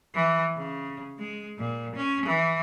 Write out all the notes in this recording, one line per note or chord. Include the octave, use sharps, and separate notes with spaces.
E3
C#3
G#3
A#2
C#4
E3